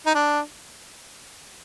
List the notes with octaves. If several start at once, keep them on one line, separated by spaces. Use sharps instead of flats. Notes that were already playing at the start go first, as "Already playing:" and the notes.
D#4
D4